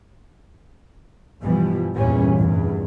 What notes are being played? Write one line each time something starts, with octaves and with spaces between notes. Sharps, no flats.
G2 B2 E3 F3 G3
E2 G2 A#2 E3 G3 C#4
F1 E2 G2